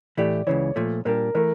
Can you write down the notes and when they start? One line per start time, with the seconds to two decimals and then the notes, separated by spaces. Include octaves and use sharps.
0.17 A2 E3 A3 E4 G4 D5
0.47 C#2 C#3 E3 C#5
0.76 A#2 F3 A3
1.05 A#2 G3 D4 A#4
1.35 E3 A3 A#4